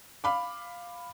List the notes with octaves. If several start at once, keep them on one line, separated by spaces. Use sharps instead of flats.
F5 B5 D6